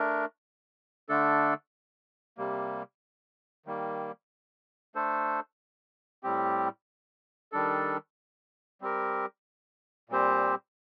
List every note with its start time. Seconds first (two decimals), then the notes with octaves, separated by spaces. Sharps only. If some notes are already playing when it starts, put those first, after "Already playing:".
Already playing: A3 D4 A#4
1.09 D3 A3 D4 A4
2.37 C3 G3 A#3
3.66 D#3 G3 A#3
4.95 A3 D4 A4 C5
6.23 A2 G3 C4 G4
7.52 D#3 G3 D4 A4
8.81 G3 C4 G4 A#4
10.09 A#2 G3 C4 G4 C5